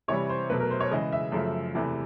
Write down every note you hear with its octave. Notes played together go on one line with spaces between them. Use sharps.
C3 E3 G3 C#5
C5
B2 F#3 A3 B4
A#4
C5
C#5
C#3 E3 G#3 D#5
E5
F#2 C#3 F3 A3
E2 C3 E3 A3